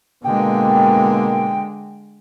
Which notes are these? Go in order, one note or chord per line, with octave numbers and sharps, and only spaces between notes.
B2 D3 G#3 A#3 G5